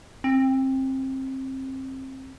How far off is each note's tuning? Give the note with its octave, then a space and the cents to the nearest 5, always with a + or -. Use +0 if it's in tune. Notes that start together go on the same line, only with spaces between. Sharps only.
C4 +25